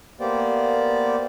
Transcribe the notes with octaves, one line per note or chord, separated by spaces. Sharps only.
A#3 B3 G4 C5 D5